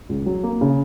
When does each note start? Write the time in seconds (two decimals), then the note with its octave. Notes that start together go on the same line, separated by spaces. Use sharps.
0.09 C#2
0.26 F#3
0.43 A#3
0.61 C#3